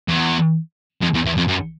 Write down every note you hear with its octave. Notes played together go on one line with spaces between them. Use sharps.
E2
F2
E2
E2
F2
F#2